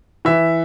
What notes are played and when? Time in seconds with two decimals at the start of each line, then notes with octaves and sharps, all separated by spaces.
0.25 E3 E5